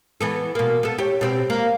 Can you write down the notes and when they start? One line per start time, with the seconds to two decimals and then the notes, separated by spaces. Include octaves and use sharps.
0.21 E3 B3 A4
0.55 B2 A#3
0.83 B3 A4
0.98 G4 C#5
1.21 B2 C4 G4
1.50 A#3